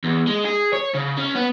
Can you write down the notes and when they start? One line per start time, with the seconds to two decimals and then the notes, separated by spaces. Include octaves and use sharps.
0.04 E2
0.27 G#3
0.45 G#4
0.73 C#5
0.95 C#3
1.18 C#4
1.35 B3